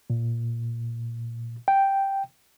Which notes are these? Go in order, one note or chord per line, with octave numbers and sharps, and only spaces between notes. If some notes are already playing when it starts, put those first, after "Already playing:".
A#2
G5